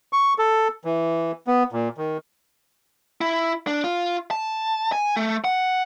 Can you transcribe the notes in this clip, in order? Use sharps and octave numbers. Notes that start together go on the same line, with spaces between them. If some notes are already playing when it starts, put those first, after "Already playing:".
C#6
A4
E3
B3
A#2
D#3
E4
D4
F4
A5
G#5
A3
F#5